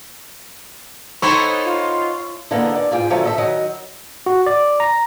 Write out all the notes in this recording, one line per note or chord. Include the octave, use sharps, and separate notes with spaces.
B3 D#4 E4 A4 C5 C#5 C6 C#6
F4
D3 E3 G#3 A#3 B3
D5
G#2 F4 G#4 G5
D3 F3 F#3 G#3 A3
A4 D#5 E5
D#3 F#3 D#5
F#4
D5
A#5